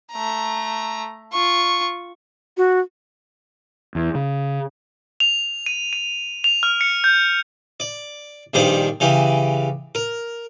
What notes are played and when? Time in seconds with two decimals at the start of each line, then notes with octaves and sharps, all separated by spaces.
0.13 A3 A#5
1.33 F4 C#6
2.57 F#4
3.95 E2
4.15 C#3
5.20 F7
5.66 D#7
5.93 D#7
6.44 F7
6.63 F6
6.81 C#7
7.04 G6
7.80 D5
8.54 A#1 G2 D#3 C5 D5
9.00 C#3 E3 G4
9.95 A#4